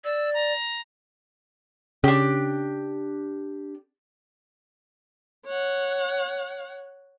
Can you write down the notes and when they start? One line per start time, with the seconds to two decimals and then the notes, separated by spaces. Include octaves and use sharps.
0.04 D5 E6
0.34 A#5
2.04 C#3 D4 G4
5.46 C#5 F#5